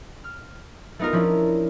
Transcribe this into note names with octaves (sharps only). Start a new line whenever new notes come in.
F6
A3 B3 D#4 F4 A#4
F3 C#4 D4 E4